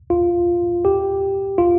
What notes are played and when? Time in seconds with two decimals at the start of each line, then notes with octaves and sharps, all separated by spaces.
0.10 F4
0.85 G4
1.58 F4